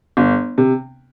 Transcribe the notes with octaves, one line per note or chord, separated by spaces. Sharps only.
G1
C3